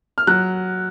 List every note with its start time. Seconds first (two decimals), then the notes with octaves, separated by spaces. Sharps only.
0.18 F6
0.27 F#3 F#6